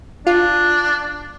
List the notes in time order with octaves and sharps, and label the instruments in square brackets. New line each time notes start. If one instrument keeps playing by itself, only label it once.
[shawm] D4 [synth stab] F4